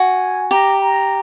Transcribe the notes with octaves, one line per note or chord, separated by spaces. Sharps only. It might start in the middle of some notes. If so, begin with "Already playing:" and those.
Already playing: F#4 G#5
G4 A#5
A#5